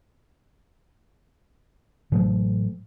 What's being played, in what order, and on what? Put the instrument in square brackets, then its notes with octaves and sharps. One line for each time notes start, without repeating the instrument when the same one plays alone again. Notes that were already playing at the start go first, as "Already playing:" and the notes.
[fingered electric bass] A2 E3 F#3 A3